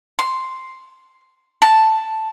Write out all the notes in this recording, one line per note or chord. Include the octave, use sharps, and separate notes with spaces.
C6
A5